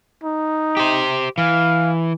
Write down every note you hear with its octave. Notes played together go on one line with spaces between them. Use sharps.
D#4
G4 C5
E3 F5